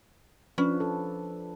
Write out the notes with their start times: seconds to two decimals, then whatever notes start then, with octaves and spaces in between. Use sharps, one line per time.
0.58 F3 C#4 D4 B4
0.80 A4